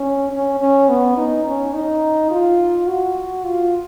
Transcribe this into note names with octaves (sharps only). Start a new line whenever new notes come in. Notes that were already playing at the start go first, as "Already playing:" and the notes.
Already playing: C#4
C#4
C#4
B3
D#4
C#4
D#4
F4
F#4
F4